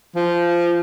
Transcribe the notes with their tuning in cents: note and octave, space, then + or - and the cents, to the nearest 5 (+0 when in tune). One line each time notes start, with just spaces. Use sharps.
F3 -15